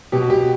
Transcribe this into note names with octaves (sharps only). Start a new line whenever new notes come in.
B2 G4
F#4
B2 G4